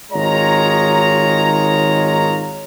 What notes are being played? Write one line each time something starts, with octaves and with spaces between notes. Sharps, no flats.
G#1 D#3 G#3 F4 C#5 A#5